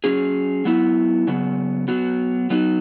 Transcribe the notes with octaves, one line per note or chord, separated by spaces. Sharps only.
F#3 C#4 G#4
F#3 B3 E4
C#3 F#3 B3
F#3 B3 F#4
F#3 B3 D#4 F#4